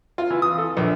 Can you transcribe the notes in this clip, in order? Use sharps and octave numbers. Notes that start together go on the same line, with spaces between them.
F4
E3
D#6
A4
A#1